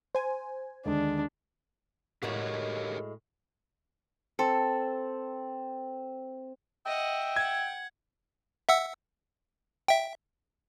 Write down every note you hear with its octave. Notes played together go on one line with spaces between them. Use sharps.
C5 G#5
D#2 D3 G#3 D4
A2 G#3 F#4 G4 A#4 C#5
C4 A4
D#5 E5 F#5 G5
F#5 G#6
E5 F#5 E6
E5 G5